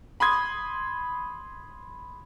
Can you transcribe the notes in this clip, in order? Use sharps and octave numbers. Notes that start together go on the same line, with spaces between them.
B5 C6 D#6 G#6